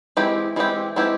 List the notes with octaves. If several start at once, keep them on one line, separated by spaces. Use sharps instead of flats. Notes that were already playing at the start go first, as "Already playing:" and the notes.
E3 G#3 C4 E4 G4
E3 G#3 C4 E4 G4
E3 G#3 C4 E4 G4